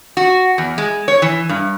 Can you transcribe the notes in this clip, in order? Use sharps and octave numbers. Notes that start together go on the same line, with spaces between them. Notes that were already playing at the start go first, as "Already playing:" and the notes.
F#4
E2
G#3
C#5
E3
G2